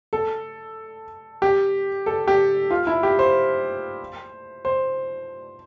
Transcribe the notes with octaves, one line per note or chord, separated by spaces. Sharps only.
A4
G4
A4
G4
F4
E4
G4
C5
C5